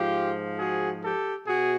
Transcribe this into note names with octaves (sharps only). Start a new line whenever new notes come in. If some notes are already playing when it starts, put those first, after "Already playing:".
Already playing: G#2 F3 F4 G4
F#4 G#4
G4 A4
B2 F#4 G#4